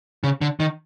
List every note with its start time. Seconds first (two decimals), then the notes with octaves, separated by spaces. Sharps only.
0.24 C#3
0.41 D3
0.60 D#3